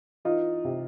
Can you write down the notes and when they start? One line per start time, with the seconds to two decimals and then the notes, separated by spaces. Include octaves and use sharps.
0.25 E3 D#4 F4
0.64 C3